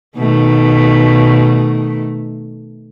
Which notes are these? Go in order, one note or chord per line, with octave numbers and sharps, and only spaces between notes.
B2 D#3 A3